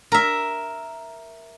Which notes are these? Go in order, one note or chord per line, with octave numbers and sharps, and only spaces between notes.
A#4 E5